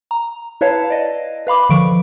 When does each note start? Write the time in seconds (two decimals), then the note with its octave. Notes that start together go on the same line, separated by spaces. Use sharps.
0.11 A#5
0.61 E4 B4 C#5 F5 A5
0.90 D5 D#5
1.47 B4 F5 B5 D6
1.69 D3 D#3 F3 C#6 D7